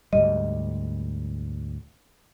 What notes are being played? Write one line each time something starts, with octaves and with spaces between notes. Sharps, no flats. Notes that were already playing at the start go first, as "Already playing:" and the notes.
D2 G#2 G3 D#5